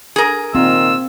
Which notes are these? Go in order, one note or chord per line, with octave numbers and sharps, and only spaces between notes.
G#4 A#4
A#2 D#3 C4 F4 E6